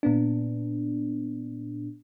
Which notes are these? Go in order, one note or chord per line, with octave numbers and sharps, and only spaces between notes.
A#2 B3 D4